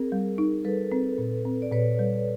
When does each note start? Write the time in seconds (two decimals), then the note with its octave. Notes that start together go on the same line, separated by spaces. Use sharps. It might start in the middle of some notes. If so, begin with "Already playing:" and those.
Already playing: C4 G#4 A#4
0.12 G3
0.38 D#4
0.65 G3 A4 B4
0.92 C4
1.18 A#2
1.45 C4
1.62 D5
1.72 A#2 B4 C#5
1.99 G3